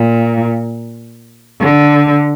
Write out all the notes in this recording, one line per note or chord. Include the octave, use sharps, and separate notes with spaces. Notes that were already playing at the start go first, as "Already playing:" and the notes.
Already playing: A#2
D3